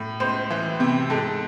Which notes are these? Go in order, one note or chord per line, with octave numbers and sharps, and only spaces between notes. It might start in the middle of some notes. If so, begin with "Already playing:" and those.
Already playing: A2
C#2 C5
E3
C3
G#2 A4